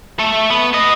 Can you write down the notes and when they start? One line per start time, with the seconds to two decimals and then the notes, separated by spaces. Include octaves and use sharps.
0.19 A3
0.50 B3
0.73 B3 D#5